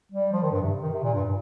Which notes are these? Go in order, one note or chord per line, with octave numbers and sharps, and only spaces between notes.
G3
F3
D#3
G2
C3
D#3
C3
A#2
G2